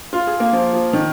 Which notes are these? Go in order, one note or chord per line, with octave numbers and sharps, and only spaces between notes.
F4
G#4
A#3
F3
F3
D#3